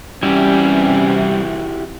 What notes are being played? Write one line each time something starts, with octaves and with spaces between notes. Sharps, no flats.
C3 E3 G3 C#4 E4 F#4 G4